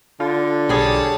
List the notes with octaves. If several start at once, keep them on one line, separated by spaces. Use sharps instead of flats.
D3 F4
B1 G3 G#4 C#5 A5